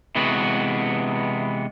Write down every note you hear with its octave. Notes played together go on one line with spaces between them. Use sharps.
C3 E3 G#3 B3 F#4